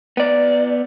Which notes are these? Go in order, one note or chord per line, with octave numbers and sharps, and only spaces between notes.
B3 D5